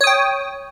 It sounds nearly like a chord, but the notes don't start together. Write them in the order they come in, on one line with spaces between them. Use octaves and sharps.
C#5 D#6 G5